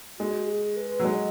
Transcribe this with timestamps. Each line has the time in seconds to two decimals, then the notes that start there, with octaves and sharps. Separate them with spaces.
0.19 G#3 F#4
0.47 G#4
0.77 B4
1.00 F#3
1.05 G#3 D#5